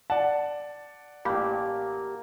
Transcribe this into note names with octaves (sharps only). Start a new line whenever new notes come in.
D5 F#5 A5
A1 A#3 G4 B5